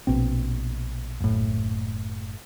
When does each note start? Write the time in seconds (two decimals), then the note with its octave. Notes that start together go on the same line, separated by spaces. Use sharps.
0.07 A#1 B2 C4
1.20 F#1 A2